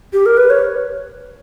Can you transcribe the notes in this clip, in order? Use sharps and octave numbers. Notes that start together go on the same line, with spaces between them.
G4
A#4
B4
C#5